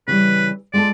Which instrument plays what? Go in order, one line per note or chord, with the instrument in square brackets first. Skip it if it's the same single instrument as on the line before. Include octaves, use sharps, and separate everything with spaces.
[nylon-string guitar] C#3 E3 G3 [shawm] B4
[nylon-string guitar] G#3 F4 A4 [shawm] D5